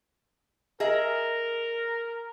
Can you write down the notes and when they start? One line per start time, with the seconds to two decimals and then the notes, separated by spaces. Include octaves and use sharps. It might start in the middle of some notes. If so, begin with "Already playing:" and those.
0.80 G#4 A#4 D#5 E5